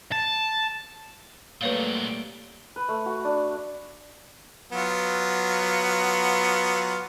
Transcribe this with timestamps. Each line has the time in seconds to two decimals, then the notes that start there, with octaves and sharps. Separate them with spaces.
0.12 A5
1.61 A#2 F#3 G3 A3 A#3 B4 C#5 F5
2.76 B4
2.89 A3
3.06 F#4
3.25 D4
4.72 F#3 B3 F4